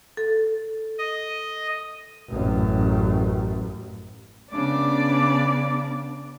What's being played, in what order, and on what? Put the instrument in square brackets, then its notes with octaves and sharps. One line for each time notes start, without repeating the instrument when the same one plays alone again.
[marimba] A4
[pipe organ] D#5
[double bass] A1 F#2
[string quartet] C#3 B3 D4 D5 D6